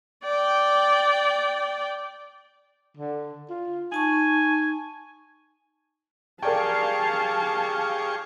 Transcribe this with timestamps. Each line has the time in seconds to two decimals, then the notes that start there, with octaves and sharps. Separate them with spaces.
0.24 D5 G5
2.97 D3
3.50 F4
3.92 D#4 G#5 A5 C#6
6.43 G4 G#4 A#4 D5 F5 G5 A5 C#6